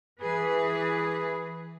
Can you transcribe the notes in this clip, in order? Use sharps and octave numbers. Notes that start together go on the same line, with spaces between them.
E3 G#4 B4